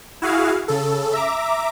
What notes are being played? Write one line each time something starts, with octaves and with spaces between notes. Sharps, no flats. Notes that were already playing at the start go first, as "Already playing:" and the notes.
E4 F#4 G#4 F5
C#3 A4
E5 A#5 D6